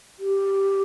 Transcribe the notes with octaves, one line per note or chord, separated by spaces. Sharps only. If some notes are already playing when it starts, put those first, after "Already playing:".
G4